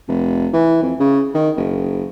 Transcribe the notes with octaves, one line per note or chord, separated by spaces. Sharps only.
F1
E3
F2
C#3
D#3
F#1